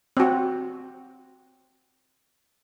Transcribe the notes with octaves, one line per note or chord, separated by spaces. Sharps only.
C4 F#4